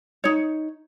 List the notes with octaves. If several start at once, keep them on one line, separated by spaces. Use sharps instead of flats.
D#4 C#5